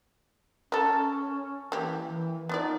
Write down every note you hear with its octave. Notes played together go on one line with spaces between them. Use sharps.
C#4 A4 A#4
E3 A#3 G4
E3
B3 D#4 F4 D5